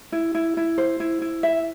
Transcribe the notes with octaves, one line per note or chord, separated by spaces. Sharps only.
E4
E4
E4
C5
E4
E4
E5